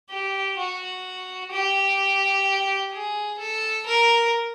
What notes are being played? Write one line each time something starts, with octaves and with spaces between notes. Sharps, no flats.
G4
F#4
G4
G#4
A4
A#4